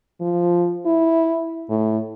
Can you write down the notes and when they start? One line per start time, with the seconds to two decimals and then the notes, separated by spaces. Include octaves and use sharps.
0.21 F3
0.86 E4
1.69 A2